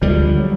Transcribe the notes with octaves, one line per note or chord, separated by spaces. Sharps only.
D2 D3 F3 G3 G#3
F#3